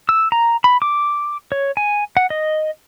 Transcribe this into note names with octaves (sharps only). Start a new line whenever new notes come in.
E6
A#5
B5
D6
C#5
G#5
F#5
D#5